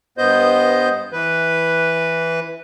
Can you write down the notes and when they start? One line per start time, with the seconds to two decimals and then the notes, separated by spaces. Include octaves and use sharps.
0.18 G2 B3 C5 D#5 G6
1.12 E3 B4